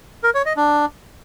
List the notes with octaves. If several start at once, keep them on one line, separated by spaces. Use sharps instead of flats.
A#4
C#5
D#5
D4